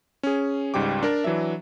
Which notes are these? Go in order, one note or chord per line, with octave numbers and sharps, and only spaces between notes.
C#4 G#4
C#2 G#2 G3 G5 D6
D4 A#4 A5
E3 F#3 D4 E5